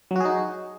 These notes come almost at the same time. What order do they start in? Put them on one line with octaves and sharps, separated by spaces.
F#3 F#4 G#4 D#4